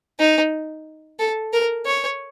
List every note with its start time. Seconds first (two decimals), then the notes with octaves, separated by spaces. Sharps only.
0.19 D#4
1.19 A4
1.53 A#4
1.86 C#5